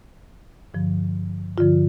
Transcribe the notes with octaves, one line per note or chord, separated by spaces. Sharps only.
G2 D3 F3
G2 D3 F3 F4